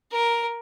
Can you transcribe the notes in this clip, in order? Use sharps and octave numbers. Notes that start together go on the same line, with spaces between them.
A#4